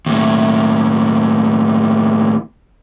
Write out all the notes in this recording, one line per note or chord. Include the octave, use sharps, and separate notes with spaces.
D#2 A2